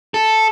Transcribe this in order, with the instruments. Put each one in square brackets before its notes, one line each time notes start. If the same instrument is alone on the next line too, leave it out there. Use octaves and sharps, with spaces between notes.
[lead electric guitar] A4